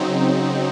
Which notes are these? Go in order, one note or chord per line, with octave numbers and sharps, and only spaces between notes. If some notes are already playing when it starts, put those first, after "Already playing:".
Already playing: C#3 F#3 C4 D#4